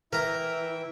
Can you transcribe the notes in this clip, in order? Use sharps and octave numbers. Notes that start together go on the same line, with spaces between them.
E3 E4 A#4 E5 G5 A#5